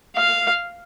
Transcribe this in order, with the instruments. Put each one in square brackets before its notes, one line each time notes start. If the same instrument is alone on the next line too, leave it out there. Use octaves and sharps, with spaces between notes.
[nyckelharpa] F5